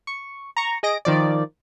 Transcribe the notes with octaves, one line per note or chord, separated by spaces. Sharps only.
C#6
A#5 C#6
G#4 D#5 A#6 D7
D#3 F3 D5